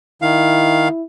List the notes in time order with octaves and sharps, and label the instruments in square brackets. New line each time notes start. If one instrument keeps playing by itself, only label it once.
[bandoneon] D#3 F5 [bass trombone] E4